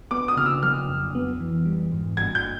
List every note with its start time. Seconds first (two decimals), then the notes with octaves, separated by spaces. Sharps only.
0.11 B3 D6
0.28 D#6
0.37 C#3 F6
0.46 E6
0.63 F#3 F6
0.89 F2
1.15 B3
1.40 E3
1.65 G3
1.92 G#2
2.17 G1 G#6
2.35 G6